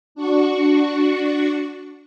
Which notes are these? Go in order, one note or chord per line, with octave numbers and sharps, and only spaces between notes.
D4 F#4 C#6